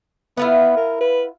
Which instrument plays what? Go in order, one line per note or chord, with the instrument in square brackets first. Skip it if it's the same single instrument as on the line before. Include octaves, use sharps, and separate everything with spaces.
[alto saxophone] B3 [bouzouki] E4 F4 F#5
[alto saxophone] A#4
B4